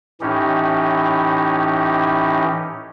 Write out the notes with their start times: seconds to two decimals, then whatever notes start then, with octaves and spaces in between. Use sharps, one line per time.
0.21 A2 E3 C#4 D#4 G4